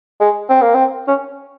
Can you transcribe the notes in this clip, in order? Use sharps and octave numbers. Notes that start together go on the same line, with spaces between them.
G#3
C4
A#3
C4
C#4